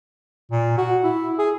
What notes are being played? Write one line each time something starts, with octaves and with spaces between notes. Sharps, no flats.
A#2
F#4
E4
G#4